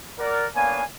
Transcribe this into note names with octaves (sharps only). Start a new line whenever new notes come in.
A#4 D5 F#5
A#3 B3 D4 C#5 F5 G#5